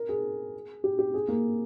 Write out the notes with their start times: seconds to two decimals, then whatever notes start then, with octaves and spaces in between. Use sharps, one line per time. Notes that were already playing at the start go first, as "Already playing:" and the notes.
Already playing: A#4
0.09 G#4
0.84 G4
0.99 G4
1.14 G#4
1.28 A#3